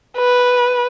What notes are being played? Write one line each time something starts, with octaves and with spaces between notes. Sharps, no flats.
B4